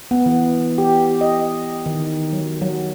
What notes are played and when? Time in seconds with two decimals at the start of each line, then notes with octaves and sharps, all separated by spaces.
0.11 B3
0.26 E3
0.78 G4
1.21 D#5
1.86 D#3
2.33 F#3
2.61 F#3